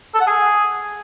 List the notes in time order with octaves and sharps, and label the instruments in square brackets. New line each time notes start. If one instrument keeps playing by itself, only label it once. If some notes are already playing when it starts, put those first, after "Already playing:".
[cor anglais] A4
F#5
G#4